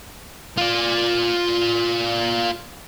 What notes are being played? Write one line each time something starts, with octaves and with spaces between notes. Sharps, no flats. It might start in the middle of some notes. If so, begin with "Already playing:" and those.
F4 D5